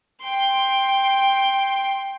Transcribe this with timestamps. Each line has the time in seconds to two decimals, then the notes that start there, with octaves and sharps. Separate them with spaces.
0.22 G5 C6